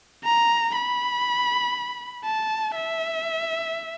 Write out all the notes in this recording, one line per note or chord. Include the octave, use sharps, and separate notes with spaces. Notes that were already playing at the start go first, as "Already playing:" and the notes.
A#5
B5
A5
E5